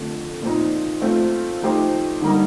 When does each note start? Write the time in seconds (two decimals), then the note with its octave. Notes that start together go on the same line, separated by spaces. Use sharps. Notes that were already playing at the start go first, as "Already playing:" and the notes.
Already playing: F2 D3 F3 A3
0.42 A#2 F3 C4 D#4
1.01 A3 C4 F4
1.62 F3 A3 D#4 G4 C5
2.21 D3 G3 A#3 D#4